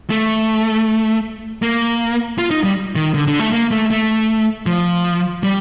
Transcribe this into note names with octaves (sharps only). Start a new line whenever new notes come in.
A3
A#3
F4
D#4
G3
D#3
D3
D3
A3
A#3
A3
A3
F3
G3